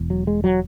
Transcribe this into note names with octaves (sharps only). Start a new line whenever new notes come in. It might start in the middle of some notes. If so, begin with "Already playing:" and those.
Already playing: E1 E2
F#3
G#3
F#3